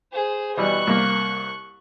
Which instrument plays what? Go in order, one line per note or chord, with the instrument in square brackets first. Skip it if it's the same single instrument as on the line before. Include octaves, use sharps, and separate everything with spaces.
[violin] G#4 C5
[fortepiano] B2 E3 G3 [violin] C#6 F#6
[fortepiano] C2 A#3